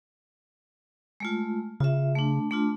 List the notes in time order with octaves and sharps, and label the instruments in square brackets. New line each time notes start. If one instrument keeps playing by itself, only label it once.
[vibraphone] G#3 A3 F4
[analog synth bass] C#3 [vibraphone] F4 E5
[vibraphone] A3 D4
A3 D4 F4